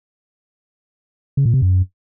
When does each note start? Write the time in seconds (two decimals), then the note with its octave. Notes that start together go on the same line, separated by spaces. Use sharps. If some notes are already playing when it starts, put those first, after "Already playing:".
1.37 C#3
1.45 A#2
1.54 C3
1.62 F#2